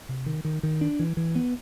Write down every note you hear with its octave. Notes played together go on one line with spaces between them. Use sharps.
C3
D#3
D#3
D#3
D4
E3
E3
B3